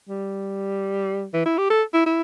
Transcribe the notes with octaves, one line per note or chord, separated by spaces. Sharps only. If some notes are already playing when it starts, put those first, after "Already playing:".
G3
E3
E4
G4
A4
E4
E4